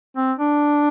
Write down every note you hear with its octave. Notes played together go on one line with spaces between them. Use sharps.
C4
D4